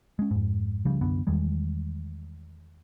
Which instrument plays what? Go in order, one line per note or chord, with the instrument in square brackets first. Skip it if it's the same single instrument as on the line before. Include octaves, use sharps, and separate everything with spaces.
[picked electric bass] G#3 C#4
F2 G#2
C#2 C#3 F3 G3
C2 F#2 D3 B3
E2 D#3 G3 G#3